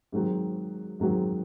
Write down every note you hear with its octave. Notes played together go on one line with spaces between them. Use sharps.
G#2 D#3 F#3 C4 F#4
G#2 D#3 F#3 C4 F#4